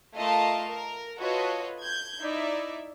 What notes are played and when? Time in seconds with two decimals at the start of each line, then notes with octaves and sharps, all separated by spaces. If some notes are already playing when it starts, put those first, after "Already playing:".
0.16 A3 F4 A#4 D#5 F5 A5
0.68 A#4
1.20 F4 F#4 A4 B4 C#5 D#5
1.81 G6 G#6
2.20 D#4 E4 D5 E5